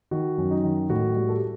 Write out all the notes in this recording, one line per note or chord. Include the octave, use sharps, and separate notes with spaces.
D#3 F#4
F#2
D#4
D#3
A2 F#4
G3
A4
G4